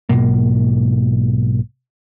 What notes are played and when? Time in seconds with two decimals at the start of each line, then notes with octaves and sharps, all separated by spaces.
0.09 B1 G#2 B2 A#3